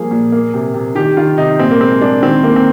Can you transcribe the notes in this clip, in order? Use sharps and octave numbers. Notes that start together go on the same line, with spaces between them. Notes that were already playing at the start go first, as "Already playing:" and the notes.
Already playing: F3 G3 A#3 G#4
A#2
A#3
C3
C3
D#3 G4
D#3 F4
C3 D#4
A#2 C4
A#3
G#3 C4
G#3 D4
D#3 C4
D#3 A#3
C4